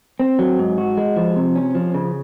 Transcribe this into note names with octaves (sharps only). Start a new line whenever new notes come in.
C4
F#3
G#2
F#4
G#3
F3
C3
C#4
F3
C#3